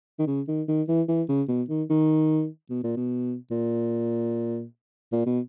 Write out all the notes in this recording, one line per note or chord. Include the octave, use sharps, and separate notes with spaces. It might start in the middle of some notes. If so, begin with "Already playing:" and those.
D#3
C#3
D#3
D#3
E3
E3
C#3
B2
D#3
D#3
B2
A#2
B2
A#2
A#2
B2